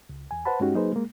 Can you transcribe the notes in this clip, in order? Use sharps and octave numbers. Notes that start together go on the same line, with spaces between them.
C#2
E2 G#5
B4 C5 F#5 A5 B5
G2 G#3 C#4 D#4 F#4 G4
F#3 A#3 D#4 G#4 B4 C5
G#3 A#3